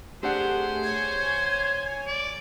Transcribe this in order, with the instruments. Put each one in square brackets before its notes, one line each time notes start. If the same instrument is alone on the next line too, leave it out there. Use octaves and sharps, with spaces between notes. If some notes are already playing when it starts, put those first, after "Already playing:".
[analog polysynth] A3 G4 G#4 [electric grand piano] C4 D4 F#5 [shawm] C5
[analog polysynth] C#5 G#5 [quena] G#6
[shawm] D5